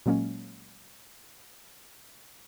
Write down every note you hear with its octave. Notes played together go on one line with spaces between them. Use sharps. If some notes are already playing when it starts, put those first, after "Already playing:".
A#2 F#3 G#3 A#3 C#4